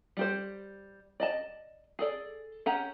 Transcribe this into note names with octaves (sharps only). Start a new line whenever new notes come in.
G3 G4 C5
D5 D#5 A5
G#4 A4 D5
C#4 G4 F#5 G#5 A#5